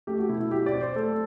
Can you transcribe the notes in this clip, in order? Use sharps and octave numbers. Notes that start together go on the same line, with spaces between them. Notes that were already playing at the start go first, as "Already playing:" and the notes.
A3 G4
F#4
B2 E4
E4
F#3 G4
D5
C4
C5
A3 A4